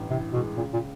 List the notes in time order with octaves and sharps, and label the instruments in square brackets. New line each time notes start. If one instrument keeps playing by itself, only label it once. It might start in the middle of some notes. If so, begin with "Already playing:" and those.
Already playing: [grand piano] A1 G2
[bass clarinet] C3 [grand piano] E3
[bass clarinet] B2 [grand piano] G#3
[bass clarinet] A#2 [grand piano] C#3
[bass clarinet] A#2